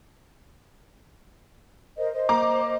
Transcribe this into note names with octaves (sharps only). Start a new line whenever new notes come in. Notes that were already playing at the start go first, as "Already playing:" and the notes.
A#4 C5 D#5
C5 D#5
A#3 A#5 D6